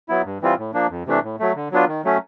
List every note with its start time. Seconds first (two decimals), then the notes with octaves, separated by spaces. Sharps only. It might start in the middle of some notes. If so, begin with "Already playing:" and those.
0.09 F#3 B3 E4
0.25 G2
0.41 E3 G3 C4 F4
0.58 A2
0.74 F3 A#3 D4
0.90 F2
1.06 C3 E3 A3 D4
1.23 A2
1.39 F#3 A3
1.55 D3
1.72 F#3 B3 D4 F4
1.88 D#3
2.05 F#3 A3 C#4